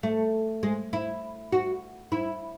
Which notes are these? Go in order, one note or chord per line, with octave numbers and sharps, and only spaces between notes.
A3
G#3
E4
F#4
E4